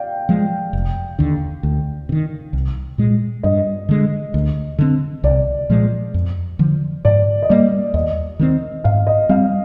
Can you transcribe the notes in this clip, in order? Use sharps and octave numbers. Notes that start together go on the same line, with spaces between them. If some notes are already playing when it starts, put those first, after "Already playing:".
Already playing: D5 F5 G5
F3 G#3
F1
D#2 D3
D2
C3
D#3
C2
A#2 G#3
G2 D#5
D3 G#3
D2
D3 F3 C4
C2 D5
A#2 F3 G#3
F2
D3 F3
G#2 D5
D#5
G3 A#3 D5
D#2 D#5
D#3 G#3 C4
G#2 F5
D#5
G3 C4 F5